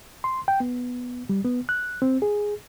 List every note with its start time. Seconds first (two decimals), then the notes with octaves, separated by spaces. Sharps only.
0.24 C6
0.48 G5
0.60 B3
1.29 G3
1.44 B3
1.69 F#6
2.02 C4
2.22 G#4